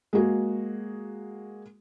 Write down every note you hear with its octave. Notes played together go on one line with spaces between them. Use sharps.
G#3 A#3 F#4 G#4